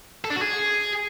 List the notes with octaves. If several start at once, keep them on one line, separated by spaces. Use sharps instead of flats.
A4
D4
F#4
G#4